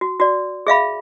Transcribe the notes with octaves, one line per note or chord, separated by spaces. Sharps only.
F#4
F#4 D5
G#4 E5 F5 B5